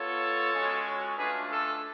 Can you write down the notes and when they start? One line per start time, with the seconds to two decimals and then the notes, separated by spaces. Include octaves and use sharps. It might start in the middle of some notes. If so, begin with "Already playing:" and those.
Already playing: B3 F4 A4 C#5
0.53 G#3 C#4 F#4
1.18 A3 D4 F4 G#4 B4
1.51 A4